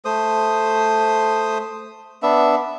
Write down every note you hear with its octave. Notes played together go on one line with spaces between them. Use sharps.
A3 C5 D#6
B3 D4 E5